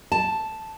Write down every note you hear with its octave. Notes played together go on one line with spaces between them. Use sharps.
A5